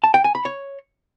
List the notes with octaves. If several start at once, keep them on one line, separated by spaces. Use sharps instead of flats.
A5
G5
G#5
B5
C#5